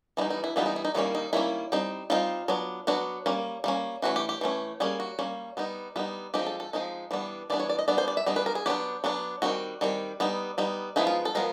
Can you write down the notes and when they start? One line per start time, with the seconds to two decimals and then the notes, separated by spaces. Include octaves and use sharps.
0.17 E3 G3 B3 D#4 E4
0.30 D#4
0.44 E4
0.56 E3 G3 B3 D#4 F4
0.66 D#4
0.76 E4
0.85 D#4
0.94 D#3 G3 A#3 C#4 E4
1.15 D#4
1.33 D#3 G3 A#3 C#4 E4
1.72 G3 C4 D#4
2.10 G3 C4 D#4 F4
2.48 F#3 B3 D4
2.87 F#3 B3 D4 F#4
3.26 G3 A#3 C#4
3.64 G3 A#3 C#4
4.02 E3 A3 C#4 F#4
4.16 G4
4.29 G4
4.41 E3 A3 C#4
4.80 G3 A#3 C#4 G#4
5.00 F#4
5.19 G3 A#3 C#4
5.57 G3 B3 D#4
5.96 G3 B3 D#4 F4
6.34 F3 G#3 C4 D#4 G4
6.47 A4
6.60 A4
6.73 F3 G#3 C4 D#4
7.11 E3 G3 B3 D4
7.50 E3 G3 B3 D4 D5
7.60 C#5
7.69 D5
7.79 D#5
7.88 G3 B3 D4 D5
7.98 C5
8.08 D5
8.17 E5
8.26 G3 B3 D4 D#5
8.36 B4
8.46 A#4
8.55 G#4
8.66 F#3 B3 D4 G4
9.04 F#3 B3 D4
9.42 D#3 G3 C4 F#4
9.81 D#3 G3 C4
10.20 G3 B3 D#4
10.58 G3 B3 D#4
10.96 F3 G#3 B3 D#4 E4
11.07 F4
11.25 A4
11.35 F3 G#3 B3 A#4